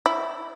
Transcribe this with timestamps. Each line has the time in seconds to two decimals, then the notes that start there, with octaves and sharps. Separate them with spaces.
0.06 E4